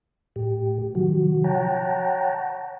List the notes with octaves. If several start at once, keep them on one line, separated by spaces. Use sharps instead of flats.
A2 G4
C3 D#3 F3 F#3 F#4
C#5 F#5 G5 A5 A#5